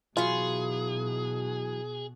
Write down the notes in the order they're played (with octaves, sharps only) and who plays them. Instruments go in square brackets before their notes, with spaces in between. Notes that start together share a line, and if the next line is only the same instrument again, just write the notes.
[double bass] B2 [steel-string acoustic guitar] E3 F#3 [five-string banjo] F4 [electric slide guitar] G#4